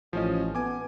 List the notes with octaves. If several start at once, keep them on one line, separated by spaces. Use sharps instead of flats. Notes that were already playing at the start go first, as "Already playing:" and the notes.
A1 F3 C#4 D#5
B3 G#5 D6